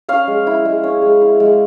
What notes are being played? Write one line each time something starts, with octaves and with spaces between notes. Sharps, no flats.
C#4 F5
G#3
E4
G#3
C#4
G#3
E4
G#3